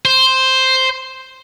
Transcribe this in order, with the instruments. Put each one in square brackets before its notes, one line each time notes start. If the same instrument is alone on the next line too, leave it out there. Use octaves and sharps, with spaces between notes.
[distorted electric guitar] C5